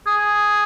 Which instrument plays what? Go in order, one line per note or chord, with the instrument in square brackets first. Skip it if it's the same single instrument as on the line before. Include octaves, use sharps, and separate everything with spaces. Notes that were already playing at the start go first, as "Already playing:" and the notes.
[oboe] G#4